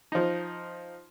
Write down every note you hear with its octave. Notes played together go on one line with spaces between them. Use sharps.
F3 D#4